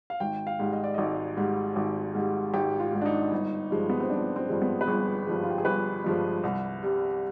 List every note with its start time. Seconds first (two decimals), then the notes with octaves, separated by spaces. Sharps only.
0.10 F5
0.20 G#1 G5
0.47 F5
0.60 G#2 G3
0.73 D#5
0.84 D5
0.94 G#1 D#5
1.37 G#2 G3
1.76 G#1
2.15 G#2 G3
2.54 G#1 G4
2.80 F4
2.93 G#2 G3
3.01 D4
3.06 D#4
3.32 G1
3.71 G2 F3 G#3
3.90 B3
4.00 C4
4.09 G1 D4
4.36 C4
4.49 G2 F3 G#3
4.62 B3
4.81 B4
4.87 G1 G#4
5.27 G2 F3 G#3
5.44 F4
5.50 G4
5.58 G#4
5.65 G1 B4
6.04 G2 F3 G#3
6.43 C2
6.83 C3 G3